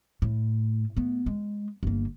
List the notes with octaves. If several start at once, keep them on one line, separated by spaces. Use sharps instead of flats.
A2
A3 B3
G#3
G1 A#3